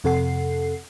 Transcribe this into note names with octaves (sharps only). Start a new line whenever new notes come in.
F2 C3 A4 F#5 C7